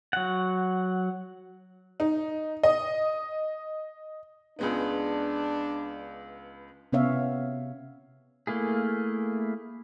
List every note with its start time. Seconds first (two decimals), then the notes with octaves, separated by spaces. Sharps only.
0.13 F#3 F#5
2.00 D#4
2.63 D#5
4.59 C#2 G#3 B3 D4
6.92 C3 B3 C#4 C#5 E5 F5
8.47 A3 A#3 E4 G#4